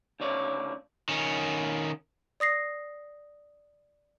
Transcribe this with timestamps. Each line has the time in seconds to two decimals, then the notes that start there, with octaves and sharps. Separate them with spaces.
0.20 D2 C#3 C#5 D5
1.09 D#3 C#4
2.40 D5 D#6 A#6 C7